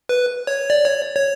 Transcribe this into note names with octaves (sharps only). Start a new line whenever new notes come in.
B4
C#5
D5
C#5
C#5